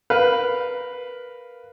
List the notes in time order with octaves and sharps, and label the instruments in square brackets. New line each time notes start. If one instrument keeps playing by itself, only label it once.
[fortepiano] A#4 B4 F5